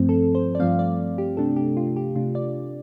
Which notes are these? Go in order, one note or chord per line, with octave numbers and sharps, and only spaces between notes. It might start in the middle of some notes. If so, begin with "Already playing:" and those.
Already playing: G2 F3 A3 C4
A4
C5
D5
G2 F3 A3 C4 F5
D5
G4
C3 A3 D4 A4
G4
F4
G4
C3 A3 D4 F4
D5